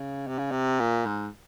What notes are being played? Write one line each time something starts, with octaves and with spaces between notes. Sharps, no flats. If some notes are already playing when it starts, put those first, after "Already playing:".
Already playing: C#3
C3
C#3
C3
A#2
G#2